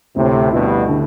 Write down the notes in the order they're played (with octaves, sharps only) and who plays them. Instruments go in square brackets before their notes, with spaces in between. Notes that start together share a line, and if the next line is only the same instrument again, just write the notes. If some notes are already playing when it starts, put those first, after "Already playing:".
[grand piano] D2 [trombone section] A2 C3
[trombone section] G2 B2 [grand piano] E4
[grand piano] D3